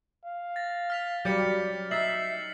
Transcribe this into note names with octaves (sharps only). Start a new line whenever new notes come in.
F5
A6 A#6
F6 B6 F7
F#3 G3 A#4 D5 G6 A6 C#7
D#4 E5 A6 C7 F#7